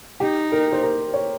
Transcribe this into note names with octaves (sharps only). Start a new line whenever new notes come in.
D#4 G4
A#4
C5
A#4
C#5